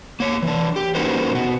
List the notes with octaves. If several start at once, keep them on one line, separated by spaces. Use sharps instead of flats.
A#3 C#5
E3 D4
G4
A#3 C#4 D#4 F#4 B4 C5
B2 F#4